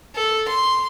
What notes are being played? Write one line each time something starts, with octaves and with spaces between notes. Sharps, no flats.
A4
C6